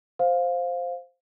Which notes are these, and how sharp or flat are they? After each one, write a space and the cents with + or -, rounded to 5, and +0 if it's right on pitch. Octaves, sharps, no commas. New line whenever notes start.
C5 +0 F5 +10